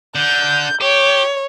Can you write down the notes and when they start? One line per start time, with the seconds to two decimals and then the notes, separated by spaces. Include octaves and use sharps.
0.15 D3 G6
0.81 G4 C#5